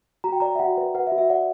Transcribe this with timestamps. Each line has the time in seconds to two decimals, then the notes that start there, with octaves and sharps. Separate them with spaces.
0.24 F#4 A#5
0.32 G5
0.40 D5 A#5
0.55 E5
0.59 F#4 F#5
0.77 B4
0.95 B4 F#5
1.07 E5
1.12 F#4
1.18 E5
1.30 D5 F#5